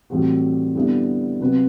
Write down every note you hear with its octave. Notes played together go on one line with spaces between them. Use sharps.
A2 E3 G3 C4 F#4
D3 G3 B3 E4
C3 F#3 C4 F#4 B4